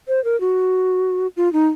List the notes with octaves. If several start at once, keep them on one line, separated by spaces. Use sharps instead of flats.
C5
A#4
F#4
F4
D#4